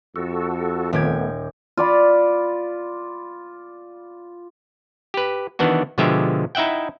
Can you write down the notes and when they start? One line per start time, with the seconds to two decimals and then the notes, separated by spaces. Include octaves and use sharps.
0.16 F2 F#4 A4
0.93 D#1 A3 B3 G4 G#6
1.77 F4 D5 B5
5.14 G4 B4
5.59 D#3 E3 B3 D4 F#4
5.98 B2 D3 F3 G#3 G4 E5
6.55 D#4 E4 E5 F#5 G5